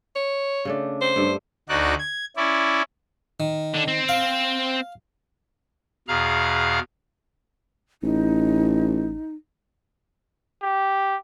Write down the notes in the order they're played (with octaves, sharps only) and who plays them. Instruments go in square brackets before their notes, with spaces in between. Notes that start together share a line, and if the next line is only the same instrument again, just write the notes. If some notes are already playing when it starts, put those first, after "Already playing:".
[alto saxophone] C#5
[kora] C#3 A3 D4
[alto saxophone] C5
[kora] G2 A3
[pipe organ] D2 D#4 F#4 D5 F#6
G#6
C#4 E4 D5
[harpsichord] D#3
[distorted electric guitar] D3 D4
C4
[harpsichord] F5
[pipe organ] E2 B2 G#4 F5 A#5 F6
[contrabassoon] A1 [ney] D#4
[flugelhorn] G4